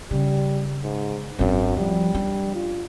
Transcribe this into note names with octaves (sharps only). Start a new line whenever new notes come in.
C#3 G3
G#2
G#1 F#2 D4
F3 G3
D4
F4